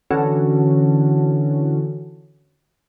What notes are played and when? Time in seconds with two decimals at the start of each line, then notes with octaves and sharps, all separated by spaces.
0.11 D3 E3 C#4 F#4 A4